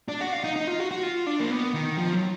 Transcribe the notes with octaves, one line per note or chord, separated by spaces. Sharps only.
D4
F#4
F4
D#4
D#4
F4
F#4
F#4
F4
D4
A#3
B3
D#3
F3
F#3